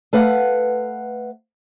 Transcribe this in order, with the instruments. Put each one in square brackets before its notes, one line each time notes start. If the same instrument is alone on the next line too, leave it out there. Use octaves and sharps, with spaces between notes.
[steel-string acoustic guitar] A3 B4 F5 F#5